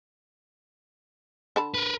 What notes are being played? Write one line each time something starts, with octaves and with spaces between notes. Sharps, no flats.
D3 A5 B5
A#4 B4